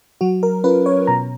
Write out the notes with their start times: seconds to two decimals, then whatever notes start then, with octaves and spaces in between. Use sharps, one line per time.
0.21 F#3 F#4
0.43 A#4
0.64 C#4 F4 B4
0.86 C#5
1.07 B2 A#5